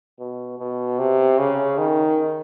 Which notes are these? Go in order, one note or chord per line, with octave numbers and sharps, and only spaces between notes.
B2
B2
C3
C#3
D#3